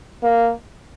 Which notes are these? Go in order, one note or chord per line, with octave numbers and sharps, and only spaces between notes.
A#3